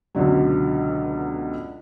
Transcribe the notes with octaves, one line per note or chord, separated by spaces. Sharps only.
C#2 B2 D3 F#3